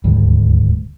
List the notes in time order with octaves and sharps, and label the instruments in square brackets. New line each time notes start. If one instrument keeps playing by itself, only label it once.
[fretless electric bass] D#1 D2 G#2 G3